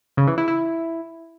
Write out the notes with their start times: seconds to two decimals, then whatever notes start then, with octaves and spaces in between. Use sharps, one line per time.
0.17 C#3
0.28 E3
0.38 E4
0.48 E4